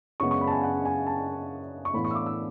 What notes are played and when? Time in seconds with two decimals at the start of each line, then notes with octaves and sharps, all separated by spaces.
0.20 F#2 C#3 G#3 B3 C#6
0.31 C#6
0.41 B5
0.47 A5
0.52 G#5
0.63 F#5
0.85 G#5
1.07 A5
1.85 C#6
1.94 A2 E3 B3 B5
2.05 C#6
2.11 E6
2.15 D6
2.26 E6